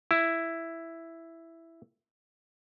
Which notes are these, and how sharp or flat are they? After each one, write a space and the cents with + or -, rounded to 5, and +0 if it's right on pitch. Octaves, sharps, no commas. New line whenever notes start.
E4 +5